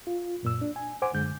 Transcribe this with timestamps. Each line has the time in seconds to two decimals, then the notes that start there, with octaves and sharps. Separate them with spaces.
0.07 F4
0.43 F#2 A#2 E6
0.61 D4
0.76 G#5
1.02 C5 F#5 G#5 D6
1.14 F#2 D3 G#3 G6